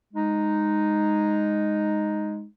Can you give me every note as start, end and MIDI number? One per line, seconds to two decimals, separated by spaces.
0.14 2.44 56
0.14 2.44 63